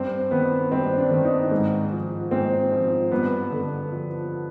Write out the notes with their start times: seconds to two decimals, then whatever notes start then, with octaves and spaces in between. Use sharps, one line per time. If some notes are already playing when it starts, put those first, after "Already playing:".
Already playing: G2 C4
0.31 D#3 B3
0.72 G2 C4
0.98 D4
1.11 D#3
1.25 D#4
1.51 G#2
1.92 F3
2.31 G#2 C4
2.72 F3
3.12 G2 B3
3.52 D3
3.91 F3